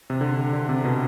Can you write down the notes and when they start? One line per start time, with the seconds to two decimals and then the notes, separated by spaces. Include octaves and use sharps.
0.10 C3
0.21 D3
0.53 D3
0.69 C3
0.85 B2